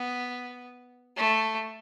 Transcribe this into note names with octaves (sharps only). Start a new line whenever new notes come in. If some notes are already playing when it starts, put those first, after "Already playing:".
Already playing: B3
A3